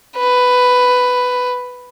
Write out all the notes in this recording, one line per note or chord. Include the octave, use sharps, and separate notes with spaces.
B4